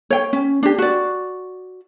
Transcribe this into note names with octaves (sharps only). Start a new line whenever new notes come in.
C#5 G5
C#4
D4 G4
F#4 D5